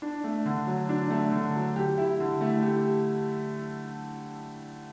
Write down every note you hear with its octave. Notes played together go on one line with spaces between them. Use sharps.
D4
A3
D3
F#3
D4
A3
D3
F#3
G4
E4
D3
A3
G4